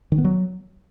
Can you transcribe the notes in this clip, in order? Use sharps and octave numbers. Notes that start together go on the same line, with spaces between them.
D#3
B3
F#3